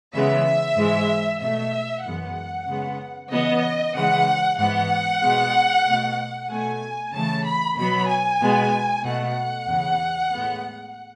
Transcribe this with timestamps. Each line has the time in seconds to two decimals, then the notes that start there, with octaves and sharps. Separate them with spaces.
0.13 C#3 E3 G#3 B3 E5
0.77 G#2 E3 G#3
1.41 B2 A3 E5
2.04 F#2 E3 G#3 B3 F#5
2.67 C#3 G#3 B3
3.31 C#3 E3 B3 D#5
3.95 C#3 E3 G#3 F#5
4.58 G#2 E3 B3 F#5
5.22 B2 G#3 B3
5.86 B2 A3
6.49 B2 A3 G#5
7.13 C#3 E3 A3 A5
7.45 B5
7.77 B2 F#3 B3 B5
8.08 G#5
8.40 B2 G#3 B3
9.04 B2 A3 F#5
9.67 E2 C#3 E3
10.31 A2 G#3 B3